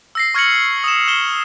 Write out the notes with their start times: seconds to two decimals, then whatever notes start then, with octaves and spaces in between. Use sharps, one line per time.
0.15 E6 A#6 C7
0.34 C#6 F6 G#6 A#6 C#7 F#7
0.84 D#6 E7
1.08 F6 E7 G7